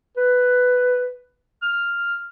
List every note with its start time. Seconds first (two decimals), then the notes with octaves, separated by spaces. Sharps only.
0.17 B4
1.62 F6